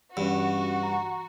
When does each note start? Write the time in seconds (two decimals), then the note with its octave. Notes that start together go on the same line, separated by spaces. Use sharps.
0.17 G2 E3 C#4 F#4 F#5
0.83 A#5